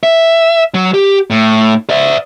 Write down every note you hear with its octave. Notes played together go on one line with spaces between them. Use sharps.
E5
F#3
G4
A2
D5 E5